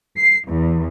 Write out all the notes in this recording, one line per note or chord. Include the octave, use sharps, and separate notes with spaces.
C7
E2